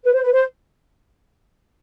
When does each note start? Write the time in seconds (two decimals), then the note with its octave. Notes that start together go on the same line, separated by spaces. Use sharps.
0.04 B4
0.14 C5
0.23 B4
0.33 C5